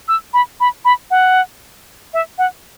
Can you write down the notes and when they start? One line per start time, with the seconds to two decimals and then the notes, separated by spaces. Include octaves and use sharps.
0.08 E6
0.33 B5
0.60 B5
0.85 B5
1.11 F#5
2.14 E5
2.38 F#5